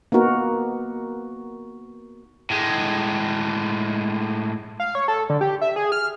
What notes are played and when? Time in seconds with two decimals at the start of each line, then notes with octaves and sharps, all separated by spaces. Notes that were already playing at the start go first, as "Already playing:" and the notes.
0.12 A#3 B3 D#4 F#4 A#4
2.50 A2 G#3
4.80 F5
4.95 C#5
5.08 A4
5.30 D3
5.41 G4
5.61 E5
5.76 G#4
5.92 F6